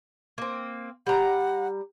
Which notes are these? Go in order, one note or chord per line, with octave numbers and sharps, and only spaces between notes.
A#3 C4
G3 F#5 A#5